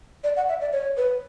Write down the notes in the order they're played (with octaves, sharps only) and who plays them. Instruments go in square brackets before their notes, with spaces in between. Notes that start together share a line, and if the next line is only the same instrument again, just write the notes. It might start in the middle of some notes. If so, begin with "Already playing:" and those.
[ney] D5
F#5
E5
D5
C#5
B4